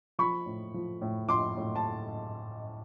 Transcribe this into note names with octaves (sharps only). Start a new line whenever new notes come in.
F3 B5 C#6
A2
F3
A2
F3 C6 D6
A2
A5